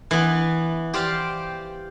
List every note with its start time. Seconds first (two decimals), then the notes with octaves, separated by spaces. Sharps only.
0.11 E3 B3
0.94 G4 C5 D5 F5 G5